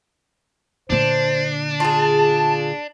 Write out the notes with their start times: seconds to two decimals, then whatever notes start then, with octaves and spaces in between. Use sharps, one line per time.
0.90 A#2 D3 D4 C5
1.80 F4 G#4 A5